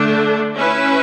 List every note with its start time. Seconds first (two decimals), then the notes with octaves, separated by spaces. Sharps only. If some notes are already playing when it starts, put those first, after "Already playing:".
Already playing: D3 A3 D4
0.56 C#4 E4 B4